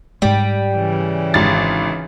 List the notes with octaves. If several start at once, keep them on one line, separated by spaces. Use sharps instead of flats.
G#2 G3 G#3
C#3 E3
G#1 A6